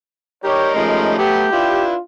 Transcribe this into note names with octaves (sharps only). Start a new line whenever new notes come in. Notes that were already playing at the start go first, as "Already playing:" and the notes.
G3 D#4 G4 A#4 C#5
F3 G#3 A3 C#4
F#3 B3 G4
D4 E4 F4 B4